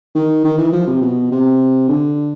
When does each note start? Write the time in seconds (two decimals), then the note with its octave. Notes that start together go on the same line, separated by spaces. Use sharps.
0.15 D#3
0.44 D#3
0.58 E3
0.73 F3
0.87 C3
1.02 B2
1.31 C3
1.88 D3